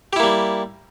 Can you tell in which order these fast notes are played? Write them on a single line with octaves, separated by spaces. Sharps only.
G4 E4 A#3 G3